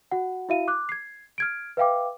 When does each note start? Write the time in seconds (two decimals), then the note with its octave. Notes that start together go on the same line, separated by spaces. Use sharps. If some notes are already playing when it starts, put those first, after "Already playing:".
0.11 F#4 F#5
0.49 E4 F#4 E5 F5 D#7
0.68 D6 F#6
0.89 G#6 C7
1.38 F6 G#6 D7
1.77 B4 E5 F5 G5 D6